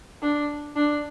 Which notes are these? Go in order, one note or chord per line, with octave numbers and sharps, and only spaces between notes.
D4
D4